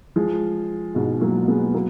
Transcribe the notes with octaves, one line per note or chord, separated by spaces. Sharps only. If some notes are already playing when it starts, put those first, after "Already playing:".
F3 G#3
G#2 B2
F#3 A#3
G#3 B3
F#3 A#3